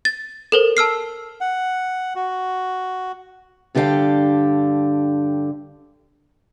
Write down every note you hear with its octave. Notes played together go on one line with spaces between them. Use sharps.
A6
A4 A#4 C5
A5 E6 F6 C7
F#5
F#4
G2 D3 G4 B4 F5 G5